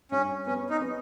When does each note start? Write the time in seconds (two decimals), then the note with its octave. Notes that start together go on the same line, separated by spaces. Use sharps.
0.12 G2 C#4
0.47 B3 C#4
0.70 D#4
0.81 B3